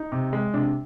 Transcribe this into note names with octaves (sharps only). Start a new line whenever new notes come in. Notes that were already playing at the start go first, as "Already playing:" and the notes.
Already playing: D#4
C3
G#3
C3 D4